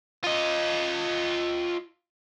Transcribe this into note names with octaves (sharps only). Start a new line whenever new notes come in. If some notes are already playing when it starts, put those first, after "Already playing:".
F4 D#5